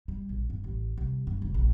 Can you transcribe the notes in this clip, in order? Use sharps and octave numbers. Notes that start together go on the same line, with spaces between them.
G3
A#1
G2
A1
C2
G2
F1
A#1